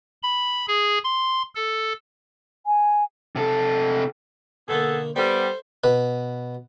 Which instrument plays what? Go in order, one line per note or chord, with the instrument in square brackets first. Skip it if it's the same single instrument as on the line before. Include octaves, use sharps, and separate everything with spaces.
[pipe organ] B5
G#4
C6
A4
[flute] G#5
[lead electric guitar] C3 A4
[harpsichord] B2 D3 A#3 [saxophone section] B3 G#4 A4
[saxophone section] G3 B3 [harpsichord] A4 E5 [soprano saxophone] C5
[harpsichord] B2 B4